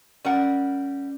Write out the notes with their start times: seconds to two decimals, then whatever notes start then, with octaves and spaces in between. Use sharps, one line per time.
0.25 G3 C#4 A#4 F#5